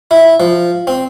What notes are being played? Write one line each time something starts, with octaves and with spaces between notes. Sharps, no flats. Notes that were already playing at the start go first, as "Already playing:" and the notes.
E4
F3
C4